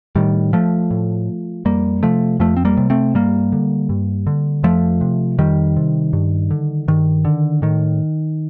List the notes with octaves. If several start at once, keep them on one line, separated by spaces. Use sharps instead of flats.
A2 D#3 G3
F3 A3
A2
F2 G3 A#3
C3 F3 A3
F2 F3 A3
C4
G3 A#3
C3
A3 C4
G2 G3 A#3
D3
G2
D3
F2 F3 A3
C3
F2 D#3 G3
C3
G2
D3
G2 D#3
D3
A2 D#3